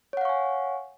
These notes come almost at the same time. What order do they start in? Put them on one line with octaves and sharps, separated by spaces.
C#5 F#5 F5 C#6 G#5